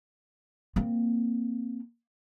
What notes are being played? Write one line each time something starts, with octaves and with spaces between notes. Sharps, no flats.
A#3 C4